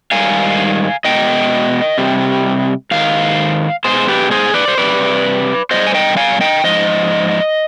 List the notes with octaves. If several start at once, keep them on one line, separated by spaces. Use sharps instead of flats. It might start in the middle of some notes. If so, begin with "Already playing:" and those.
G#2 D#3 G3 F5 G#5
B2 G#3 D#5 G5
C3 G3
G#2 D#3 F5
B2 G#3 G#4 C5
G4 B4
G#4 C5
B4 D5
C5
C3 G3 B4 D5
B2 G3 C5 D#5
G#5
D#5 G5
F5 G#5
D#5 G5
G#2 F3 D#5